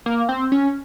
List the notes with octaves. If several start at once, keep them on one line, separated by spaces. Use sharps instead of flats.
A#3
C4
C#4